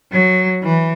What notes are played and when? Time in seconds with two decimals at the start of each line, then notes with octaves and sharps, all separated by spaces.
0.12 F#3
0.63 E3